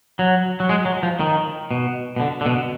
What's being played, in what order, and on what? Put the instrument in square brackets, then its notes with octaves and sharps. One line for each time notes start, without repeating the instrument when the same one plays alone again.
[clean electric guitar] F#3
F#3
G#3
F#3
F3
D#3
B2
B2
D3
D3
B2